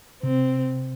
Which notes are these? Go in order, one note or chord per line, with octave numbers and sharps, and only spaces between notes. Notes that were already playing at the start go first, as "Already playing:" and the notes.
C3 C4